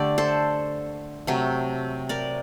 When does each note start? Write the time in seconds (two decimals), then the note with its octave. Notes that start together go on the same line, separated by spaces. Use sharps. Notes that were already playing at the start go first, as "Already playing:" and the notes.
Already playing: D3 A3 G4 D5
0.18 A4 C5
1.27 C3 F#3 A3
2.09 A#4 D5